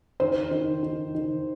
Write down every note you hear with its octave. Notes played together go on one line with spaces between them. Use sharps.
D#3 C5
D#3
D#3
D#3